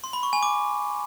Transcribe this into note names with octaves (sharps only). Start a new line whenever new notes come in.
C6
B5
C#6
G#5
D6